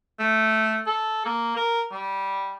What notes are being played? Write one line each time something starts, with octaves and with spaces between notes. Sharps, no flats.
A3
A4
A#3
A#4
G3